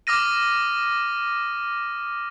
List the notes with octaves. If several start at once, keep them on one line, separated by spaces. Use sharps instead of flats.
D6 D#6 F6 A#6 D#7